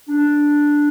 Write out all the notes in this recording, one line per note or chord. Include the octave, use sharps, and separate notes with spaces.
D4